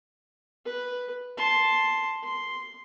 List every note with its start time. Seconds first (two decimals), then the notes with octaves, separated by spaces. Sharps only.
0.66 B4
1.37 A5 C6
2.23 C6